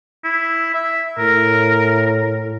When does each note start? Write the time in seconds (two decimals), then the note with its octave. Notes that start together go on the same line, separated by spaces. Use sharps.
0.24 E4
0.74 E5
1.18 A2 A#4